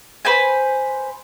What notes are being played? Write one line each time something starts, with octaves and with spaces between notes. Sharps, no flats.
B4 C5 G#5